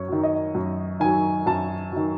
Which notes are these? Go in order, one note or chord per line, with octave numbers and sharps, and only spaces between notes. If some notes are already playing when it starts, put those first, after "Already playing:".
Already playing: F#2 C#5
D#3 F#3
D#5
F#2
D#3 F#3 G#5
F#2 A5
D#3 F#3